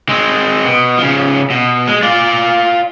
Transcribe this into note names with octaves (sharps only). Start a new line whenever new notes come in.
G#3 C4
B2
C#3 F3
B2
G#3
F4 D5